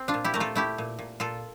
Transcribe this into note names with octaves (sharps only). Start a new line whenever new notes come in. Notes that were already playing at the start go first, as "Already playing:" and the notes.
Already playing: C4
D4 F4
A#2
E4 G4
A3 A#4
F4 A4
A3 E4 G4
A#2
A#2
A#2 F4 A4